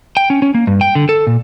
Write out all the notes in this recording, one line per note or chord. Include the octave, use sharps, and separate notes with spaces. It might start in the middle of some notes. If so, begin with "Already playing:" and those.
G5
C#4
C#4
A#3
G2
G5
D3
A4
A#2